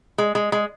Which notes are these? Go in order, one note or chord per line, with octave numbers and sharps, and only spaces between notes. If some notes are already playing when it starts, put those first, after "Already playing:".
G#3
G#3
G#3